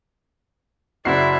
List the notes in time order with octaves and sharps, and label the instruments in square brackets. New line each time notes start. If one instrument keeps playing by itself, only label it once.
[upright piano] F#1 F#4 C7 [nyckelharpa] E4 D5